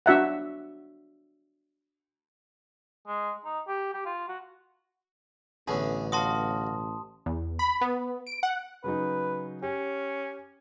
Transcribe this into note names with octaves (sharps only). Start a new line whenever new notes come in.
D4 F#4 E5 F#5
G#3
D#4
G4
G4
F4
F#4
A1 D3 B3 C#4 G#4 E5
F#4 D#5 F5 A5 C6 D#6
E2
B5
B3
D7
F#5
C#3 F#3 D#4 B4
C#4 G4